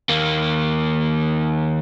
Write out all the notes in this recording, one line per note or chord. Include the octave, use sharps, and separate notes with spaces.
D#2 A#3